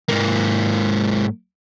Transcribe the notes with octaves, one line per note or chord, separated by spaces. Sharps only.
G#2 A#3